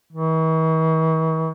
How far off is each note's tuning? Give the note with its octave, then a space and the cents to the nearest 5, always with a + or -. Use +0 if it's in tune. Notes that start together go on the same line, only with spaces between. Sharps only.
E3 -45